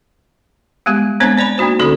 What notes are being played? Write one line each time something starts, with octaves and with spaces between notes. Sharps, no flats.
G3 G#3 B3 G4
G#3 B3 C4 D4 C5 C#5
C5 D5 G#5 B5
A#3 D4 D#4 F#4 C5
D3 G3 C#4 F#4 A4 D5